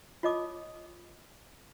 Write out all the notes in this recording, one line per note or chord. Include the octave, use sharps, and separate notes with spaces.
F4 C#5 D#5 A5 D6 D#6